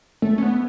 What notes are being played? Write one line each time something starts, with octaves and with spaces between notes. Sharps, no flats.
A3
C#4
B3